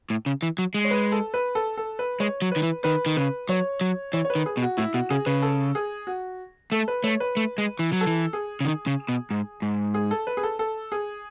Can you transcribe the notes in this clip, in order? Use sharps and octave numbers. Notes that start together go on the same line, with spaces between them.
A2
C#3
E3
F#3
G#3
C#5
B4
A4
B4
A4
A4
B4
G#3 C#5
F#3
D#3 B4
E3
D#3 B4
D#3
C#3 B4
F#3 C#5
F#3
E3 C#5
C#5
B4
D#3
G#4
B2
F#4
A2 E4
B2 F#4
C#3 G#4
C#3 B4
A4
G#4
F#4
A3 A4
B4
A3 C#5
B4
A3
G#3
E3
F#3
A4
E3
G#4
C#3
D#3
C#3
B2
G#2
G#2
G#4
A4
B4
G#4
A4
A4
G#4